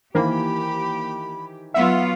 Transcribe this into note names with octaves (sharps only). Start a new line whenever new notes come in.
D#3 E3 A#3 G4 C5 B5
F#3 B3 F4 E5 F#5